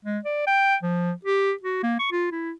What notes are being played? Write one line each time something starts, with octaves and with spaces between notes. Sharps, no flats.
G#3
D5
G5
F3
G4
F#4
A#3
C#6
F4
E4